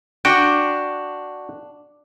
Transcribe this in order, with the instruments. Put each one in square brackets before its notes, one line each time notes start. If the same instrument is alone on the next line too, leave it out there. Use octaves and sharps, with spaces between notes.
[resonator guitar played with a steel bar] D4 [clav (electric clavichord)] F#4 G5